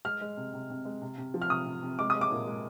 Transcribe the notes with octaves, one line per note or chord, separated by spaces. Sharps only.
G#3 F6
G#3
C3
C3
C3
G#3
C3
C3
F3
F6
C3 D#6
C3
C3
G#3 D6
D#6
G#3
D6
A#2
G#3